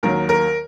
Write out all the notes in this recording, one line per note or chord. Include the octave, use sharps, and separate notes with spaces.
D#2 D#3 F#3 A#4
A#4